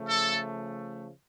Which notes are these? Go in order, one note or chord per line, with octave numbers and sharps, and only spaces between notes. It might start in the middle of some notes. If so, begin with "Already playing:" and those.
Already playing: C#3 F3 A3
A4